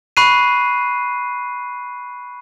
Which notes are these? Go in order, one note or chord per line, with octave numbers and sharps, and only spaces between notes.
B5 C#6 F#6 C7 D#7